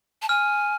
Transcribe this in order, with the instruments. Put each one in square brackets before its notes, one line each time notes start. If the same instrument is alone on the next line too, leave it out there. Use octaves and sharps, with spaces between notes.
[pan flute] A5
[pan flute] G#5 [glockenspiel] F6